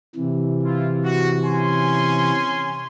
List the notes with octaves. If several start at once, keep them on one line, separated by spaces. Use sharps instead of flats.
C3 E3
E4 F4
F#4
C#4 G#5 C6